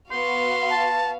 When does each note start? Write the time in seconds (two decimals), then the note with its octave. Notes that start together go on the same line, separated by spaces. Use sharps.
0.12 B3 F#4 F5 C6
0.70 A5